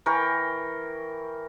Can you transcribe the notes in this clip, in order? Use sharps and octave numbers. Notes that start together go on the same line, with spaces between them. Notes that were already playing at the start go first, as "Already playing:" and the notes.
E3 A#4 G5 C#6